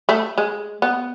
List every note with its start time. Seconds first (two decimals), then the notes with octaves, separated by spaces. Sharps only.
0.09 A3
0.38 G#3
0.82 B3